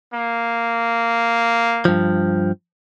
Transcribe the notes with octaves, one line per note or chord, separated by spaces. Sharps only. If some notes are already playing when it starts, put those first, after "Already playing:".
A#3
G2 F3